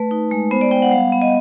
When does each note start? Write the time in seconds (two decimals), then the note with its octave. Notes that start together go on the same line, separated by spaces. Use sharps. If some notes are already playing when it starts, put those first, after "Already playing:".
Already playing: A3 B4
0.11 D#4
0.31 G#3
0.51 B3 C5
0.61 D5
0.71 B3 G5
0.82 F#5
0.91 G3 F5
1.12 B3
1.22 D#5